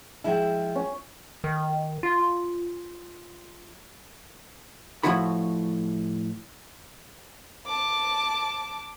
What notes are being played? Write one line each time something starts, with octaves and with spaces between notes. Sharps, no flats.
F3 G#3 E4 E5 G5
C#4
D#3
F4
A2 F3 F#3 E4 F#4 B5
A5 D6